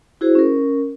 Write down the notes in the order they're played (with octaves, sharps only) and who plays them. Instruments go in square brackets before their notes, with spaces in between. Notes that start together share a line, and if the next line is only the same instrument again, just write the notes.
[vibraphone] E4 F#4 G#4 C5
C#4 A#4